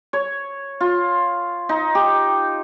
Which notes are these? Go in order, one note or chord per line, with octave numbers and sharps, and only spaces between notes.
C#5
F4
D#4
G4